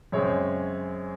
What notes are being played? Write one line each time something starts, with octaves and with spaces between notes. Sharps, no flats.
F#2 C#3 G#3 C4 C#5